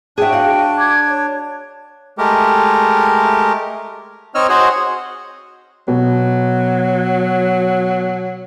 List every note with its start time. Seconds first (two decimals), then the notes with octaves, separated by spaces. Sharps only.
0.18 D4 F#4 G#4 E5 G5
0.32 F5 F#5
0.78 D6 G#6
1.07 C#5
2.18 G#3 A3 G4 A#4
4.35 C4 D#4 C#5 D#5 E6 F6
4.49 F#4 G#4 C5 C#5 D#5 F#5
5.88 B2 F#3